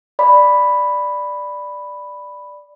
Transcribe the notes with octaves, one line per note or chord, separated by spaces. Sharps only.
D5 B5